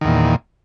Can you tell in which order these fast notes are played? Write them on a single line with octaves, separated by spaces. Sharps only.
D#3 E2 A#2